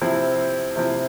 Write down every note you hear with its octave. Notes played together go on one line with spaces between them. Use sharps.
C3 F3 C4 E4
C3 F3 C4 E4